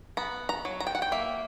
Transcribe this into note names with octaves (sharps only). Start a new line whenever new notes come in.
B3 A#5
A#5
F#3
A#5
G5
F#5
G5
A#3 E5